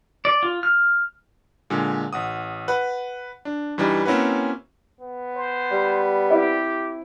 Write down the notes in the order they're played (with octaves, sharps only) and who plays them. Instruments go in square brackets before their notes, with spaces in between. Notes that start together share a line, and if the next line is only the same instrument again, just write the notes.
[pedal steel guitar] D5
F4
F6
[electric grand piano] A#2 D3 G#3
A1 F#5 D#6
B4 F#5 B5
D4
G2 E3 G3 D#4 G5
A#3 C4 C#4 E4 F#4 B4
[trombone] B3
[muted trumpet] C5
[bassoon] G3
[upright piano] C4 E4 [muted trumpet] G4